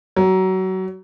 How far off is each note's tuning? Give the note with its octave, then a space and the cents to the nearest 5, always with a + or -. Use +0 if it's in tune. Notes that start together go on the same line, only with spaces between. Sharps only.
F#3 +25